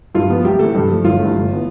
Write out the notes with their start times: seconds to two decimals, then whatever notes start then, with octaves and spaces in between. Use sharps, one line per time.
0.15 G2 F4
0.29 F3 B3
0.44 C2 G4
0.59 C3 E3 A3 A4
0.75 G2
0.89 F3 A3
1.04 G1 F4
1.19 G2 E3 A3
1.34 G1
1.51 E3 B3